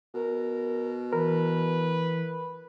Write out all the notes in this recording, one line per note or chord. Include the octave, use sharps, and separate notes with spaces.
B2 A#4
E3 A#4 B4